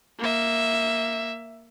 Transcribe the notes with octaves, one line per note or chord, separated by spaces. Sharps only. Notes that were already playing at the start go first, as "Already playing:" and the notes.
A#3 E5